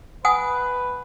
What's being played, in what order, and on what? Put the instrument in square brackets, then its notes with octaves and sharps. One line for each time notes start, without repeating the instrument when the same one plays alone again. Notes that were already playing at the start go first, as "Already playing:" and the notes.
[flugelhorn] B4 [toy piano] F#5 G#5 D#6